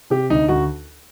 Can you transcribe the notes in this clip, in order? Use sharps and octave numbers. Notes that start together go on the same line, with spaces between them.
C3 G4
D2 D#4
D2 F#4